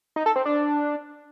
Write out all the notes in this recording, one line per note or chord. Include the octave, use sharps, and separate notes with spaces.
D#4
A4
C4
D4